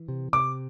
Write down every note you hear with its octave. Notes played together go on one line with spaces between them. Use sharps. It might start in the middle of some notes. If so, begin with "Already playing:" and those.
Already playing: E3
C3
C3 D6